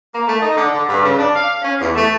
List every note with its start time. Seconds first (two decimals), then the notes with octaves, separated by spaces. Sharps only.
0.14 A#3
0.28 A3
0.42 D#4
0.56 D3
0.73 D3
0.89 G2
1.02 C#3
1.17 D4
1.35 F5
1.62 C#4
1.80 E2
1.95 A3